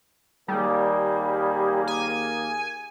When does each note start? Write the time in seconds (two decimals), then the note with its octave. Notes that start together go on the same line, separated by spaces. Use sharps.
0.48 D#2 G3 A#3 G#4
1.87 G#5